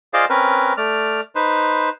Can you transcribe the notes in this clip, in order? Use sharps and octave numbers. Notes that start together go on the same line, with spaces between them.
F4 G#4 C5 D5 D#5 F5
C4 C#4 A#4 B4
A3 D5 F6
D#4 B4 C5